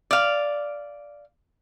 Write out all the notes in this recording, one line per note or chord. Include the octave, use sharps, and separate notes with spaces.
D5 F5